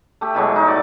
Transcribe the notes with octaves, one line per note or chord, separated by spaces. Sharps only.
A3 G4
B2 E3 F#3 G#3
D#4 F#4
A2 D5 D6